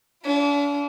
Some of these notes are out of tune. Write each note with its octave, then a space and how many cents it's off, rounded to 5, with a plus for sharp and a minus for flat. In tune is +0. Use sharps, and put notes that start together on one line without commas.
D4 -40 F4 -40